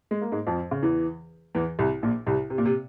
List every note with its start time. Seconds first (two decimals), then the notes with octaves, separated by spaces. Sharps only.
0.11 G#3
0.22 A#3
0.32 G#2 G#3
0.47 F2 F3
0.71 C#3
0.83 E2 E3
1.55 E2 E3
1.79 C2 C3
2.03 A#1 A#2
2.26 C2 C3
2.50 C3
2.58 A#2
2.66 C3